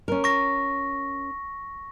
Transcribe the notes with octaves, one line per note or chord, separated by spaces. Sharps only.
C#4 A#4
C#6 A#6